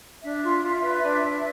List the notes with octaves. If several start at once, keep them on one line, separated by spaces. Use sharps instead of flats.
D4 E5
F4
F4
B4
D4
D4